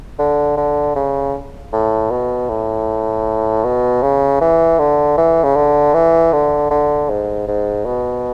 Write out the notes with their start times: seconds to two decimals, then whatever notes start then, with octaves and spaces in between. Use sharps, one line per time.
0.19 D3
0.57 D3
0.95 C#3
1.73 A2
2.11 B2
2.49 A2
3.64 B2
4.02 C#3
4.41 E3
4.79 D3
5.17 E3
5.44 C#3
5.56 D3
5.94 E3
6.33 D3
6.70 D3
7.09 G#2
7.48 G#2
7.86 B2